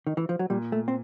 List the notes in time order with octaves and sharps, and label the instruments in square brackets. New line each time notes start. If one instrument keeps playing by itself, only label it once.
[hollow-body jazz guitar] D#3
E3
F3
F#3
[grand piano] A#2 [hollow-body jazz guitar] G3
[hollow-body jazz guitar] A3
C4